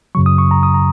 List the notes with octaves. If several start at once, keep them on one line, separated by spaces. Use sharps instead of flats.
F#2 C#3 F#3 C#6
D#6
C#6
A#5
D#6
A#5